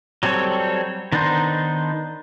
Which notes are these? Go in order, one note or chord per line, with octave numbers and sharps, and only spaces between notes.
F#3 G3 C4 A4 C#5
D#3 B3 D4 D#4 C5